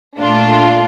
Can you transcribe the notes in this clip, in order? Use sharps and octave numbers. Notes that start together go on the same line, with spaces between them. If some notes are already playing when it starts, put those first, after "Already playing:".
A#2 A3 D4 F4